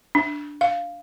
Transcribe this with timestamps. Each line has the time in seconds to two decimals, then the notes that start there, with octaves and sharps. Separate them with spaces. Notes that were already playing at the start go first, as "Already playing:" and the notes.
0.15 D4
0.61 F5